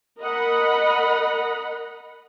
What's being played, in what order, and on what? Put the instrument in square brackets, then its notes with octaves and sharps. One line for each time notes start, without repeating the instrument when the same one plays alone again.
[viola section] A#4 D#5 F#5 B5